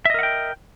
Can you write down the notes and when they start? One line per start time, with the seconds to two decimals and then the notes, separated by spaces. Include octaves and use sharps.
0.05 E5
0.10 D#5
0.14 A#4
0.19 F#5
0.23 G5